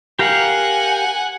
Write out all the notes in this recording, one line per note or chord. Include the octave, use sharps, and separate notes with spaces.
G4 A#4 F5 F#5 G#5